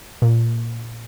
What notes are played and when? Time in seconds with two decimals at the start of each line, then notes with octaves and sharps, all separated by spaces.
0.22 A#2